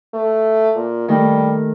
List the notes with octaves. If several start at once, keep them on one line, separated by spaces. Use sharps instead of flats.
A3
A#2
D#3 G3 A3